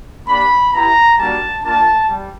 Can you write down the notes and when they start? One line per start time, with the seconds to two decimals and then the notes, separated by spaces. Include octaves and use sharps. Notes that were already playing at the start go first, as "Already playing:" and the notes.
0.27 A#3 D4 G4 B5
0.72 B3 E4 G4 A#5
1.17 G3 A#3 D4 F#4 A5
1.63 A#3 D4 F4 A5
2.08 G3